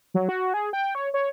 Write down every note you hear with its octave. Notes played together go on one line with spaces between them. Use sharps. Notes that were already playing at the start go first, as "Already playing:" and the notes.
F#3
F#4
G#4
G5
C#5
C#5